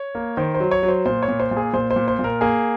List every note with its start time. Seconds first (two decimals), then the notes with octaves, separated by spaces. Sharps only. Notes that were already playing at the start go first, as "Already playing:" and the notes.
Already playing: C#5
0.15 A#3
0.37 D#3 C5
0.55 C5
0.60 F#3
0.71 C#5
0.83 F#3
0.88 C5
1.05 A#2 C5
1.23 C#5
1.28 A#2
1.40 C5
1.51 A#2
1.57 G#4
1.73 A#2 C5
1.91 C5
1.96 A#2
2.08 C5
2.19 A#2
2.24 A#4
2.41 A#3 G#4